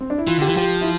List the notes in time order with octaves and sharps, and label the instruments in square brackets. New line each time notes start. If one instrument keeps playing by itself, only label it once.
[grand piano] C4
D4
E4
[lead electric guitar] E3 [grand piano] F4
[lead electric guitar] D3
[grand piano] G4
[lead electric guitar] E3
[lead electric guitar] F3 [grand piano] G4
[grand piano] E4